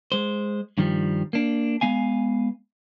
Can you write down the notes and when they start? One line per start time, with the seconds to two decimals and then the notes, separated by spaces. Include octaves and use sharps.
0.12 G#3 C5
0.78 G2 D#3 F3 G3
1.33 A#3 D4
1.81 G#3 B3 F5 G#5